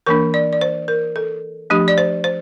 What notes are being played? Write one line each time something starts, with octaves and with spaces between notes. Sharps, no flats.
E3 A#3 D4 A#4
D5
D5
C5
A#4
A4
F3 A3 D4 G4
D5
C5
C5